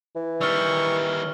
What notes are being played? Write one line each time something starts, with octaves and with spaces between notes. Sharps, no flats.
E3
D#3 G3 C#6 E6 F6